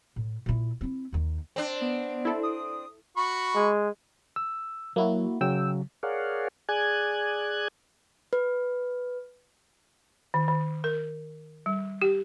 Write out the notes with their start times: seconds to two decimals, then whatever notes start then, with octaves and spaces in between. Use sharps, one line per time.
0.16 A2
0.46 A#2 E4
0.81 C4 E4
1.13 D#2 D#3
1.56 C4 D4
1.81 B3
2.25 E4 A4
2.43 D#6
3.17 F#4 B5 C#6
3.55 G#3
4.36 E6
4.96 F#3 A#3 E4 F#4
5.41 C#3 F#3 G5 E6
6.03 G#4 A#4 C#5 D5 F5 F#5
6.69 G#4 D5 G#5 F#6 G#6
8.33 B4
10.34 D#3
10.48 D#3
10.84 A#4
11.66 G3
12.02 G4